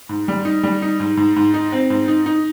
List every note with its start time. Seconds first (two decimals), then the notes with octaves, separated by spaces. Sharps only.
0.09 G#2
0.28 G3
0.45 D#4
0.63 G3
0.82 D#4
1.00 G#2
1.17 G#2
1.36 G#2
1.54 D#4
1.72 C4
1.90 G#2
2.08 D#4
2.26 D#4